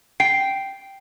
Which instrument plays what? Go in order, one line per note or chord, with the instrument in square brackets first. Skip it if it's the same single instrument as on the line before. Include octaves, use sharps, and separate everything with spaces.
[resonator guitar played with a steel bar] G5 [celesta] C7